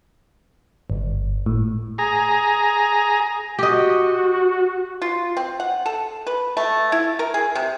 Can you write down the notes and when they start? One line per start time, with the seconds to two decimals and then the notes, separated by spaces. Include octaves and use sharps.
0.90 G1
1.46 A2
1.98 G#4 A#5
3.59 F#4 G4 D#5
5.02 F4
5.37 C4
5.60 F#5
5.86 A4
6.27 B4
6.57 A3
6.92 E4
7.19 A#4
7.34 G#4
7.55 C3